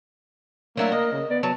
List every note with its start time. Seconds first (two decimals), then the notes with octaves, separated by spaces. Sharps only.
0.77 F#3 A3 A#3 D4 E4
0.92 A#4 D#5
1.13 C#3
1.30 B3 D5
1.43 F#3 B3 A5